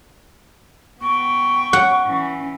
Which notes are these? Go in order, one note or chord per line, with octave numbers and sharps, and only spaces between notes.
B3 G5 C#6
F#5
E3 C#4